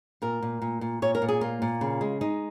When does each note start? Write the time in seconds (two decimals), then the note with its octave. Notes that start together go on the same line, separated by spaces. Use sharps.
0.22 A#2 A#4
0.42 A#2
0.62 A#2
0.81 A#2
1.02 A#2 C#5
1.15 A#4
1.22 A#2
1.28 G#4
1.41 A#3 F4
1.62 A#2
1.81 C#3
2.01 G#3
2.21 G#3 D#4